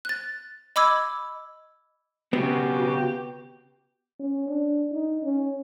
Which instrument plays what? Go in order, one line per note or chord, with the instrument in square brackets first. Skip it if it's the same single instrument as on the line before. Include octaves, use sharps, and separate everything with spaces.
[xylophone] F#6 A6
D#5 B5 D6 E6 G#6
[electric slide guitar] C#3 C4 [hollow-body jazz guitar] B3 [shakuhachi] F#4 [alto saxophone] G4
[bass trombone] C#4
D4
D#4
C#4